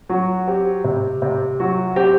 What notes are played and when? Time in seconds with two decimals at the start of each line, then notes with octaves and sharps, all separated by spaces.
0.09 F#3 F#4
0.47 C4 G4
0.84 C3
1.22 C3
1.60 F#3 F#4
1.96 C4 G4